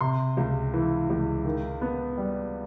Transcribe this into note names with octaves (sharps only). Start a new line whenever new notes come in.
C3 C6
C#2
E3
C#2
D#3
B3
G3